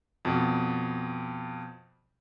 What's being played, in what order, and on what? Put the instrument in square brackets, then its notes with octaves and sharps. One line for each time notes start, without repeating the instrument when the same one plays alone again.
[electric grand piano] F2 B2